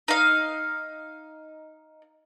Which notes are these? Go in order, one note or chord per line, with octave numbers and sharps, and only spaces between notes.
D#4 F5